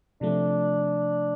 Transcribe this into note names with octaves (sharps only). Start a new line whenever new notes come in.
C3 F3 A3 D4